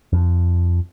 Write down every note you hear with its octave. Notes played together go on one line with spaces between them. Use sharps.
F2